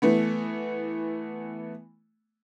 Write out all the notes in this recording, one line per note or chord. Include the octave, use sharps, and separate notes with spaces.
E3 A3 B3